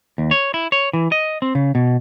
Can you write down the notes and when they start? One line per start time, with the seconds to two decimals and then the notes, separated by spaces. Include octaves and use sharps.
0.18 D#2
0.31 C#5
0.54 E4
0.72 C#5
0.93 E3
1.12 D#5
1.42 C4
1.55 C#3
1.75 B2